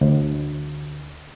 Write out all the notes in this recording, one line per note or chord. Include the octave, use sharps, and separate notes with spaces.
D2